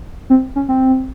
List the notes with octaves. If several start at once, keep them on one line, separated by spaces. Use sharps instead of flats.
C4
C#4
C4